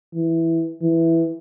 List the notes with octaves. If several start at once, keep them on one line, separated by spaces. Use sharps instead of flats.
E3
E3